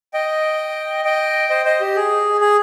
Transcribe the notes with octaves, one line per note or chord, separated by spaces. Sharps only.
D#5 G5
D#5 G5
C5 D#5
C5 D#5
G4
G#4
G#4